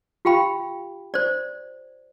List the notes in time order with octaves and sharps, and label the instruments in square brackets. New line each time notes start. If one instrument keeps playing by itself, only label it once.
[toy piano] F4 G4 F5 G5 B5
C5 D5